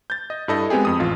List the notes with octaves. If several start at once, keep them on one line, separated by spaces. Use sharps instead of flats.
G6 A6
D#5
G2 E4 A4 D#5
G#3 B3 C4 G4 G#4
F2 D#6
A1 F4